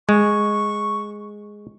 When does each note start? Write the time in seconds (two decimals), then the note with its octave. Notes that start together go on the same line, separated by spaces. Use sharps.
0.09 G#3 C#6